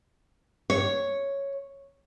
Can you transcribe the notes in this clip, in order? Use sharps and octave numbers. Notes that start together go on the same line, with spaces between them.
C#5